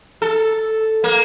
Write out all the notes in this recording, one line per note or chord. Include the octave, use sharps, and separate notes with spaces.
A4
A#3